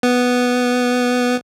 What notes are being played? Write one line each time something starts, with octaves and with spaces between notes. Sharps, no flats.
B3